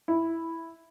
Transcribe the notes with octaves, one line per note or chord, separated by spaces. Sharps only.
E4